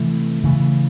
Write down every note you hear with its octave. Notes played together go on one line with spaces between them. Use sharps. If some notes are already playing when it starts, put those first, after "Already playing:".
Already playing: C3 E3 A3
C#3 E3 A3